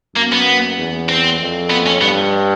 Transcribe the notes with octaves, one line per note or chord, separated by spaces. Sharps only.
F#2 A#3
B3
E2
C4
F2
B3
C#4
G2 B3